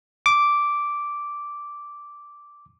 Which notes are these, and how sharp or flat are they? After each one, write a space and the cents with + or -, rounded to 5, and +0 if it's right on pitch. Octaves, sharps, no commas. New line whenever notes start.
D6 -5